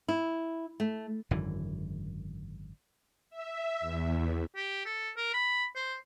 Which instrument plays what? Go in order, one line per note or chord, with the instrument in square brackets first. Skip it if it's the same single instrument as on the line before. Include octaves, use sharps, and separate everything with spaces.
[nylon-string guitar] E4
A3
[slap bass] G#1 F#2 D3 E3
[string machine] E5
E2
[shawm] G4
A4
A#4
B5
C5